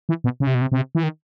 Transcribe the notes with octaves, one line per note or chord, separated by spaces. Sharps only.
E3
B2
C#3
C3
B2
C3
C3
E3
D#3